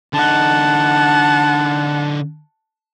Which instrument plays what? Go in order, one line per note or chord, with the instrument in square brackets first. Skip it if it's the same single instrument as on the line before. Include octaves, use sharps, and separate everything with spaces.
[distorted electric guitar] D3 D#4 [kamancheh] F#5 A5